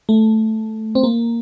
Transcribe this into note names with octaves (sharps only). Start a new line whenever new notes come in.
A3
C4
A#3